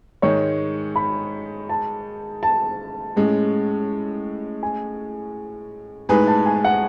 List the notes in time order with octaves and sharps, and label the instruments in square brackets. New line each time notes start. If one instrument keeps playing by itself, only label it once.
[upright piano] G#2 D#3 G#3 [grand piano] C#5
[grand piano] B5
A5
A5
[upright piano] A2 G#3 C#4
[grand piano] G#5
[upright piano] A2 G#3 D#4 G#4 B4 [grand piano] G#5
[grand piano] A5
G#5
F#5